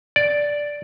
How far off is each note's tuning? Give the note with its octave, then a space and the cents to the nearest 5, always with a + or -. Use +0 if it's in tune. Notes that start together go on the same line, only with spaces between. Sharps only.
D5 -5